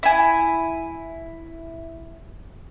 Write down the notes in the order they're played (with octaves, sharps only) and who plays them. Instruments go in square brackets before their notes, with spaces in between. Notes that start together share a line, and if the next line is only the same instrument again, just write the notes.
[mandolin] E4 G#5